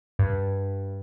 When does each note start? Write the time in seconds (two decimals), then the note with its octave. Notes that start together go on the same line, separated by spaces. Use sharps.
0.19 G2